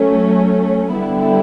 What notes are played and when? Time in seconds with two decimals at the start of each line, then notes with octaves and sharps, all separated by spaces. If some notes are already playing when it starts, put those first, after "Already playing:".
Already playing: F#3 A3 C#4
0.95 D3 G3 B3 E4 G4